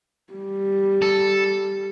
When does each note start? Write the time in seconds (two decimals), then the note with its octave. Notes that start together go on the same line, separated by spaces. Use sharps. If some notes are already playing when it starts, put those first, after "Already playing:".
0.33 G3
1.02 A4